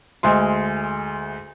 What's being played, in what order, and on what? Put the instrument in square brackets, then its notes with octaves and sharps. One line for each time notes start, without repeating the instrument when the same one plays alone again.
[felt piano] D2 G#3 C6